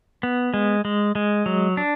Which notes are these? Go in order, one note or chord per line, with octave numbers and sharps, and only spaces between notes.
B3
G#3
G#3
G#3
F#3
D4